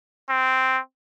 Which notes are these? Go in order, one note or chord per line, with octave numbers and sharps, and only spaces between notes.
C4